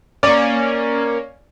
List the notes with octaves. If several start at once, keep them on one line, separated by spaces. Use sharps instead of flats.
A#3 C#4 D5